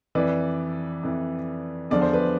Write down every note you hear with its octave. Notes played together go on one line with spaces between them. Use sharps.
F2 E3 B4 D5
F2 E3
E2 D3 F3 D5
C5
B4